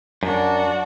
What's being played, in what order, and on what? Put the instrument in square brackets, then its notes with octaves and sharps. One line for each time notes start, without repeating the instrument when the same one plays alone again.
[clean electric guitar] F#2 [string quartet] D4 F#4 D5